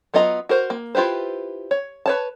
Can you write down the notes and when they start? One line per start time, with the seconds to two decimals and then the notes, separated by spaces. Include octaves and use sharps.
0.14 F#3 B3 F4 D#5 A#5
0.49 F#4 A#4 C5
0.70 A#3
0.95 E4 F4 G4 B4 C5
1.71 C#5
2.06 B4 C#5 A5